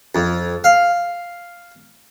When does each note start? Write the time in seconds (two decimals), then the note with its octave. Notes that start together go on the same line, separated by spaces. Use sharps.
0.15 F2
0.64 F5